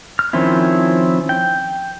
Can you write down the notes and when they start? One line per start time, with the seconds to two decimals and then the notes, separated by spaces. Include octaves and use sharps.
0.19 F6
0.33 D#3 F3 C4 C#4 E4
1.29 G5